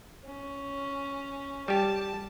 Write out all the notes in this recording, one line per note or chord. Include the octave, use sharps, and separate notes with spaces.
C#4
G3 G4 A5